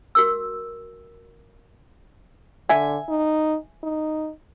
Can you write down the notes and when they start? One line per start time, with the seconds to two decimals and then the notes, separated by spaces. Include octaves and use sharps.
0.15 F#4 A#4 E6
2.69 D3 E5 G#5
3.09 D#4
3.83 D#4